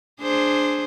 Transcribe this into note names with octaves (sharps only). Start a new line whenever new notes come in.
D4 G#4 C5